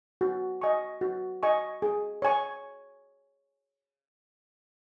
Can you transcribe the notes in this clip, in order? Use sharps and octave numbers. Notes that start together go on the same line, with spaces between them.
F#4
D#5 G#5 C#6
F#4
D#5 G#5 C#6
G#4
C#5 G#5 C#6